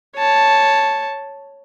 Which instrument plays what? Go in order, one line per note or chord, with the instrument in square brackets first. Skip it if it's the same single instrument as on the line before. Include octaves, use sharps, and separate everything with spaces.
[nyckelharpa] C#5 A5